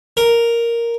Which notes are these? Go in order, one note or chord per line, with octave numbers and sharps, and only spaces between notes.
A#4